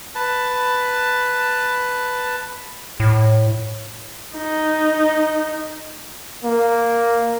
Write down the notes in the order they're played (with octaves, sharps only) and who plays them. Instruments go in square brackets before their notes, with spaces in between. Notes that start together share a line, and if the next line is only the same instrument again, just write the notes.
[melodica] B4 A5
[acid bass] A2
[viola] D#4
[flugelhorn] A#3